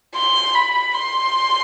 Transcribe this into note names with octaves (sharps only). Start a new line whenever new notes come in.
C6
B5
C6